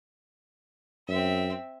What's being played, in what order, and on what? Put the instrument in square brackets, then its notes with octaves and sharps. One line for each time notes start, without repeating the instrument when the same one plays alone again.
[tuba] F#2 [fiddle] C4 E5